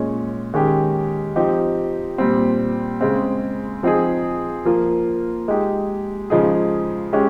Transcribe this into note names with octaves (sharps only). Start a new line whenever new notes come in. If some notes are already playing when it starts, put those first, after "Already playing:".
Already playing: A#2 G#3 C#4
D#3 G#3 C#4 G4
F3 C4 D#4 G4
A#2 G3 C4
C#3 G#3 C4
F3 C4 D#4 G#4
F3 A#3 F4
G#3 D#4 G4
C#3 F3 G#3 D#4 G#4
G#3 C#4 G4